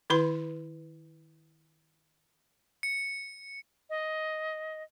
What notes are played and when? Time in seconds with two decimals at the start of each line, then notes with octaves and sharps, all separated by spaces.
0.10 D#3 E4 B4 B5 C6
2.83 C#7
3.90 D#5